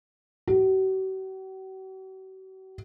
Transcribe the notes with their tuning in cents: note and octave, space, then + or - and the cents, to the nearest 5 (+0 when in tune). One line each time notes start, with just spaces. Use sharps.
F#4 +45